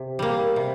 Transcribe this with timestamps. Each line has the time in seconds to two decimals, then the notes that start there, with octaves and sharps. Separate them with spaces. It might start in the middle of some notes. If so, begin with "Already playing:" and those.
Already playing: C3
0.19 G3 A#3
0.56 C3